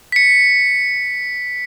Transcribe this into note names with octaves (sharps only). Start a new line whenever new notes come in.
B6 C#7